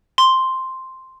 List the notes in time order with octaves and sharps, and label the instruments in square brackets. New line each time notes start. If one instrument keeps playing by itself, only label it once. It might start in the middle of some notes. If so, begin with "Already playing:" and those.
[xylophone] C6